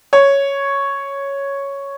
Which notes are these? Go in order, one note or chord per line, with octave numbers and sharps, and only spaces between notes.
C#5